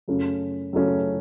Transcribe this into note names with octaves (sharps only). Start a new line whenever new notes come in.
F#2 C#3 A3 C#4
F#2 C#3 A3 C#4